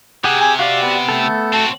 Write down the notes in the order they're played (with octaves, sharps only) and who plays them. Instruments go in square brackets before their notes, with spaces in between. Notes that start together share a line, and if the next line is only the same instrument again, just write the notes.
[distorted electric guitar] C3 [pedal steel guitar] G4 G#4 [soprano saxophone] F#5
[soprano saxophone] G#5
[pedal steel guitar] F#4 G4 D5 [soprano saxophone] F5
[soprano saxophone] B3
[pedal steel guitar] A3 A4
[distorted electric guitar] C4 F#4 [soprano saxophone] A5